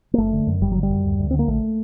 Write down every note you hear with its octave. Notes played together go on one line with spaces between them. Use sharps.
A#3
F#1 A3
D3
F#2
G1 G3
D3 F#3
G3
F#2
D2
D2
D3 C4
A#3
A#1 A3